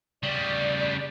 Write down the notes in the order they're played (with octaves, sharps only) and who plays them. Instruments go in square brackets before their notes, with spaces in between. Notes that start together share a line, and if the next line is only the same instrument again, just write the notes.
[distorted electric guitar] C#3 G3 [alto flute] D5